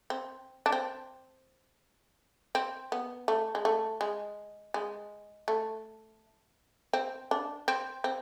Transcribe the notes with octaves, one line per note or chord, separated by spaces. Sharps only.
C4
D4
C4
C4
B3
A3
G#3
A3
G#3
G#3
A3
C4
D4
C4
C4